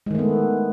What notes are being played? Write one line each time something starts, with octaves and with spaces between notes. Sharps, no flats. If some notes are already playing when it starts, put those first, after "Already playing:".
D#3 G#3 A3 B3